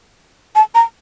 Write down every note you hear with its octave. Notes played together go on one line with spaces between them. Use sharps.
A5
A#5